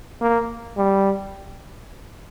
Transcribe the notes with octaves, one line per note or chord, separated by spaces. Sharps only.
A#3
G3